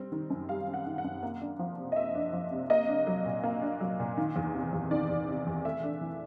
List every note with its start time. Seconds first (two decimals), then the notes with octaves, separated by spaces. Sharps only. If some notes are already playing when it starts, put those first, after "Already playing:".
Already playing: G3 C4
0.12 D#3
0.30 F#2
0.49 G3 F5
0.68 C4
0.74 F#5
0.86 D#3
0.98 F#5
1.04 F#2
1.23 A#3
1.41 D4
1.59 F3
1.78 C3
1.92 D#5
1.96 A#3 E5
2.15 D4
2.33 F3
2.51 C3
2.70 A#3 D#5
2.88 D4
3.07 F#3
3.26 A#2
3.43 A#3
3.62 D4
3.81 F#3
4.00 A#2
4.17 D#3
4.36 E2
4.54 C3
4.73 E2
4.91 D#3 D5
5.10 E2
5.28 C3
5.47 E2
5.65 A3 E5
5.83 D4
6.01 E3